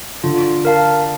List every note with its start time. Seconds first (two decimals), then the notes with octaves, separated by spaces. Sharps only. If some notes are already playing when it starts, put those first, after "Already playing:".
0.24 D3 F4
0.65 A#4 F5 A5